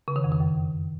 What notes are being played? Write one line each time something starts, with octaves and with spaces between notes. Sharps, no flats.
C#3
D#3
F2
D#3
F#2